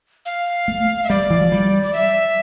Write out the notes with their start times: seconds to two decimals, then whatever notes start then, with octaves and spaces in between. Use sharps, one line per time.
0.26 F5
0.68 A3
1.04 E5
1.10 G3 D5
1.30 E3
1.41 F3
1.52 G3
1.83 D5
1.93 E5